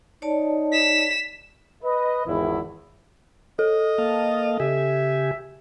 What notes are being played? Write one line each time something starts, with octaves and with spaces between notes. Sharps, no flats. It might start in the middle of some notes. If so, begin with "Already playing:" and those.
D#4 C#5 D5 A5
B6 E7
B4 D#5
G#1 E2 E4
A4 D#5
A#3 F5 A5
C#3 G4 E5 G#5